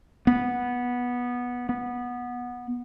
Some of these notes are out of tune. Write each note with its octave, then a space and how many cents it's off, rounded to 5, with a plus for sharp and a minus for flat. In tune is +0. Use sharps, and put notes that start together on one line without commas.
B3 -10
B3 -15